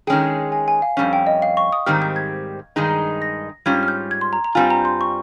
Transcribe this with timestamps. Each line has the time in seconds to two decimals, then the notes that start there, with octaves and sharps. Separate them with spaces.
0.07 D#3 G#3 C#4 G#4 G5
0.52 G#5
0.68 G#5
0.82 F5
0.97 F2 C3 G3 C#4 F5
1.13 G5
1.27 D#5
1.42 F5
1.57 C#6
1.73 D#6
1.86 G#2 D#3 G3 C4 G4 F6
2.02 G6
2.16 G#6
2.76 G2 D#3 G#3 D#4 G#4
3.22 A#6
3.66 G#2 G3 C#4 F4 G#6
3.83 F6
3.88 G6
4.11 G#6
4.21 C6
4.33 A#5
4.44 A#5
4.55 G2 G3 C4 F4 G#5
4.70 A#5
4.85 C6
5.01 C#6